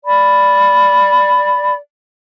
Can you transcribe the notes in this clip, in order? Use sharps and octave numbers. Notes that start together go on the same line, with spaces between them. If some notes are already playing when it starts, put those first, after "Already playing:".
D5 B5